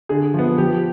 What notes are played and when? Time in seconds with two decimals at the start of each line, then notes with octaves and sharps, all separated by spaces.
0.09 D3 G#4
0.34 F3 B3
0.58 F3 G4